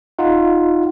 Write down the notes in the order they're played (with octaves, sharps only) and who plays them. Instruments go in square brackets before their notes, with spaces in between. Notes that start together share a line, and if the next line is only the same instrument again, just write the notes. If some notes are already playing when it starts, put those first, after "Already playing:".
[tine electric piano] D#4 F4 F#5